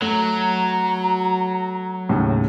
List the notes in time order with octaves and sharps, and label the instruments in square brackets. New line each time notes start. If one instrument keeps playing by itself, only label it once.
[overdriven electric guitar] F#3 [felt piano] A3 [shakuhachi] A#5
[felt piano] D#2 A2 C#3